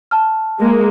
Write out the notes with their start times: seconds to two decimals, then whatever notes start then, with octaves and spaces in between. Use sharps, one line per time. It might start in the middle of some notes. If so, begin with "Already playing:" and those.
0.11 A5 F6
0.58 G#3 A#3